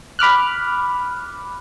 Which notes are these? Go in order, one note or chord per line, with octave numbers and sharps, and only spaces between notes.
B5 D6 F6 F#6